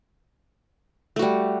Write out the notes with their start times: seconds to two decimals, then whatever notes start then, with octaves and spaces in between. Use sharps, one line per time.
1.16 A3
1.19 F#4
1.22 G3